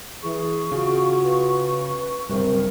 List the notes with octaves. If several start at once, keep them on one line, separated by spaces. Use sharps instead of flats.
E3 G#4 C#6
C#3 F4 F#4
B4
F#1 B1 G2 C3 A#4